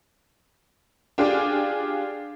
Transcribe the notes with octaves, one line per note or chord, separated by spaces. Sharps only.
D4 F4 G4 G#4 D5